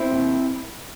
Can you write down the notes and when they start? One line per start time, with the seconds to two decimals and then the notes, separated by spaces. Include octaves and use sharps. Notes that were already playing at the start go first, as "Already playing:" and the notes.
Already playing: C4 E4
0.11 D#2 D#3